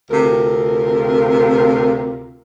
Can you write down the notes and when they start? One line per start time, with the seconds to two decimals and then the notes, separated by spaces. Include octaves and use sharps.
0.10 D2 C3 F4 A#4